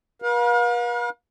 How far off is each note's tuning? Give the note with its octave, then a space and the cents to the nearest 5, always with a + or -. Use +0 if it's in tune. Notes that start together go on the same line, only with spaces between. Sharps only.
B4 -45 F5 +40